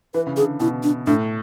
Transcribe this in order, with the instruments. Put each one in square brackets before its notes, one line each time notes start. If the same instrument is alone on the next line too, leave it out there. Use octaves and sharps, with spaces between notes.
[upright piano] E3 [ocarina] B4
[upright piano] C#3
[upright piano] D3 [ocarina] G#4
[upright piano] B2 [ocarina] E4
[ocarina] D4
[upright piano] A2 [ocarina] D4